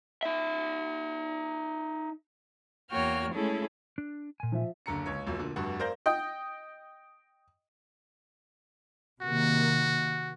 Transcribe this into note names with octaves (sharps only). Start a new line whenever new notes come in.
D#4 E5
E2 A#3 F#4 C#5 G5 F6
G#3 A3 C#4 E4 G#4 A4
D4
A#2 G#5
F3 E5
F#1 D3 A#5 C#7
C#2 C#5
F1 B1 A#2 E6
A#2 D3
F1 G2 F#4 F#5
A#4 C5 D5 F5 G6 A#6
D#5 G5
C3 D#3 A#3 F#4